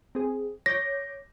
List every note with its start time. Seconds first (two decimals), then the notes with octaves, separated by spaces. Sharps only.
0.15 C4 G#4
0.66 C#5 D6 G6 A#6